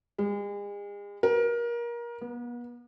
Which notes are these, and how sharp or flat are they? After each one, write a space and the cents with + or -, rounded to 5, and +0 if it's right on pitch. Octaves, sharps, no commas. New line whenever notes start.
G#3 -40
A#4 +25
B3 -40